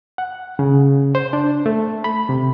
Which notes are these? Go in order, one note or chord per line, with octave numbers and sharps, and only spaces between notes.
F#5
C#3
C5
D4
A3
B5
C3